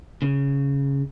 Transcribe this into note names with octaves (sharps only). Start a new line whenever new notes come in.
C#3